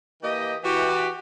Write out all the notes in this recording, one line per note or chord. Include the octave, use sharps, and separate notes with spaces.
E3 A#3 G4 D#5
E3 F#4 G4